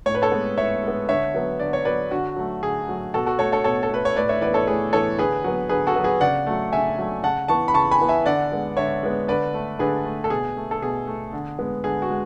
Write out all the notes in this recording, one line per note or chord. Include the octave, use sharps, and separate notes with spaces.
A2 C#5
B4
A4 C#5
G#3 B3
A2 C#5 E5
G#3 B3
D3 C#5 E5
F#3 B3
D3 D5
C#5
F#3 B3 B4 D5
D3 F#4
F#3 A3
D3 G#4
F#3 A3
B2 F#4 A4
F#4 A4
A3 A4 C#5
A4 C#5
B2 A4 C#5
A4
A3 B4
C#5
A2 B4 D5
C#5 E5
E3 B3 B4 D5
A4 C#5
A2 G#4 B4
E3 B3 A4 C#5
D3 G#4 B4
F#3 B3
D3 G#4 B4
F#4 A4
F#3 B3
G#4 B4
C#3 D5 F#5
F#3 A3
C#3 E5 G#5
F#3 A3
C#3 F#5 A5
E3 B3 A5 C#6
B5
C#3 A5 C#6
G#5 B5
E3 B3
E5 G#5
D3 D5 F#5
G#3 B3
D3 C#5 E5
G#3 B3
D3 B4 D5
A3
D3 G#4 B4
A3
A4
B2 G#4
A3
A4
B2 G#4
A3
D3
G#3 B3
D3 G#4
F#4
G#3